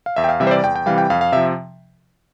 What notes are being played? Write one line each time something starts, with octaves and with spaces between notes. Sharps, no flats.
F5
E2 E5
G5
F5
C3 E3 G3 E5
C5
D5
E2 G5
G5
C3 E3 G3 F5
G5
F2 F5
F5
C3 F3 E5